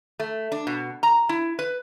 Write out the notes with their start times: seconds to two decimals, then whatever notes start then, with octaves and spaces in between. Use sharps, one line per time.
0.20 A3
0.52 D4
0.67 B2
1.03 A#5
1.29 E4
1.59 B4